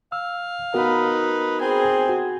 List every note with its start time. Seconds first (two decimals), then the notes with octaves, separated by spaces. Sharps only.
0.12 F5 E6
0.74 B3 D#4 F#4 A#4 B4
1.61 C4 G#4 G#5
2.09 F#4